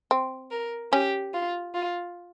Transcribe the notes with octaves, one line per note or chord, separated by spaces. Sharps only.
C4
A#4
C#4 G4
F4
F4